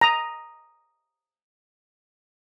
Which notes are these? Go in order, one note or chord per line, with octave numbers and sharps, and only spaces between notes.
A#5 D#6